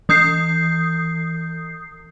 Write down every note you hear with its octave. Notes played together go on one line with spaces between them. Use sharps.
E3 D#6 G6 C7